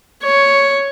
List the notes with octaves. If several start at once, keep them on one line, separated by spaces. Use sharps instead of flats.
C#5